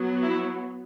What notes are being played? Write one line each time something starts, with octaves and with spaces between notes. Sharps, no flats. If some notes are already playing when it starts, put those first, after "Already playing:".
Already playing: F#3 B3
E4